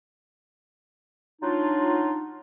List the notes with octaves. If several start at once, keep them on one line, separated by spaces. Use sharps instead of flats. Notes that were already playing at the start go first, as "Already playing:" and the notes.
F#3 D4 D#4 F4